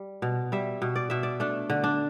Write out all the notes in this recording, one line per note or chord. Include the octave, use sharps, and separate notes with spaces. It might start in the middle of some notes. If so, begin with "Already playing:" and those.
Already playing: G3
B2
G3 E5
B2
D5
B2 E5
D5
A3 D4
D3
D4